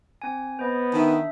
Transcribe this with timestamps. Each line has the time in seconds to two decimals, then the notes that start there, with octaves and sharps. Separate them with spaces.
0.22 C4 G#5
0.59 B3 C5 D#5
0.93 D#3 D4 E5